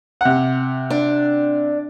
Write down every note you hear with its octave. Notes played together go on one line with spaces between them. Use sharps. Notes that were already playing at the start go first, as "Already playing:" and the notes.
C3 F#5
D4